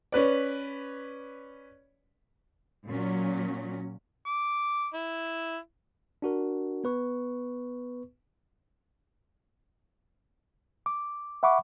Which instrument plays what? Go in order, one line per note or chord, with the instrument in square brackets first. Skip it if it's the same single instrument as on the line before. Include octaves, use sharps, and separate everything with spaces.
[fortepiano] C#4 B4 D5
[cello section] A#2 F#3 C#4
[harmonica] D6
E4
[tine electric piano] D4 F#4 A#4
B3 B4 C#6
[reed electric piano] D6
E5 F#5 B5 C#6 D6